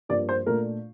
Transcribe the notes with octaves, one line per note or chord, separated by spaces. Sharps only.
G2 F3 A#3 D5
C5
A#2 A3 D4 A#4